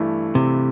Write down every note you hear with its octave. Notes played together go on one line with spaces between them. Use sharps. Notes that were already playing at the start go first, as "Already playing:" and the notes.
Already playing: G2 E3 A3 E4
C3